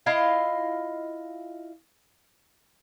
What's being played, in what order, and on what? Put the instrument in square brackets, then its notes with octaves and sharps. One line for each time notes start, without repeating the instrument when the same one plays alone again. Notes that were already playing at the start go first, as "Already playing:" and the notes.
[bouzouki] E4 F4 D#5 F5